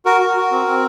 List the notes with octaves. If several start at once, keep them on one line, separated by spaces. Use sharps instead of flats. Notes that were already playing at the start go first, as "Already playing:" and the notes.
F#4 A#4
F#4
F#4
C4
C4